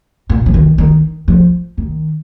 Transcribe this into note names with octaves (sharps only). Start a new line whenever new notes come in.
A#2
F3
D#3
D#3
F3
D#3